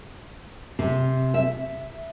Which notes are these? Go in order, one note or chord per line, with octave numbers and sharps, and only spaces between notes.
C3
E5